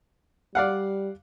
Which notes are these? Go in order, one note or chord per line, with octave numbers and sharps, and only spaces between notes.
G3 D5 F5 F#5